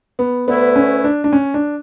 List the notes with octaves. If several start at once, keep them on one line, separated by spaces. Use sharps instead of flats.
B3
D2 D3 A3 B3 E4 B4
C#4
D4
D4
C#4
D4